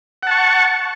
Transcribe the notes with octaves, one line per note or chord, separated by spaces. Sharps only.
F#5 A5 C#6